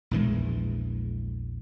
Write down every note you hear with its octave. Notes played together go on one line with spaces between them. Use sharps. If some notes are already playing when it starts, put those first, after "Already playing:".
A#1 E2 E3 G#3